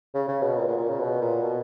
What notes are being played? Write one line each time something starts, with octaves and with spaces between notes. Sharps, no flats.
C#3
C#3
B2
A#2
A#2
A#2
C#3
B2
A#2
B2